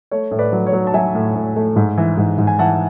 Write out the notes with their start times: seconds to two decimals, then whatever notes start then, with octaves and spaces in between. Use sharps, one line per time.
0.11 A3 C#5
0.31 A2
0.39 B4 D5
0.53 F#3
0.67 C#5
0.73 F#3
0.87 A5
0.94 F#3 E5 G#5
1.15 A2
1.35 A2
1.56 A3
1.76 G#2
1.98 E3
2.18 G#2
2.38 G#2
2.47 G#5
2.59 E3 F#5 A5